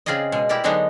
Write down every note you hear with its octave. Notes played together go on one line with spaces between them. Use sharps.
C#3 C4 F4 G#4 D5 D#5
B2 G#3
E4 G4 A#4 D5
D3 F#3 G#3 B3 D4 D#4